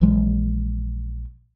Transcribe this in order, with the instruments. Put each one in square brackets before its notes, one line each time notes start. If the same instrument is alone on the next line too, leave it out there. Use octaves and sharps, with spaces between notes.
[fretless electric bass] A#1 E3 F#3 G#3